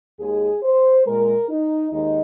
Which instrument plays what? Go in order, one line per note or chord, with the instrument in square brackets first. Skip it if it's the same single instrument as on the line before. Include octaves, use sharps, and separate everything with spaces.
[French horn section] D#2 D#3 G#3 G#4
C5
A#2 G#3 A#4
D#4
D#2 D#3 G#3 D#4